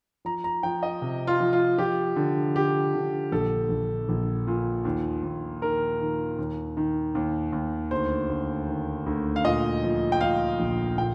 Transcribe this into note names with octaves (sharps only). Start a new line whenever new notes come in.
F3 A#5
A#5
F3 G5
D#5
C3
F4
F3
F4
F3 G4
D3
D3 G4
D3
A#1 A4
A#1
A#1
A#2
D#2
D#2
D#3 A#4
D#3
D#2
D#3
D#2
D#2
D2 C5
D2
D#3
D2
F5
A#2 D#5
F3
G5
F3 F5
A#1
A#2 G5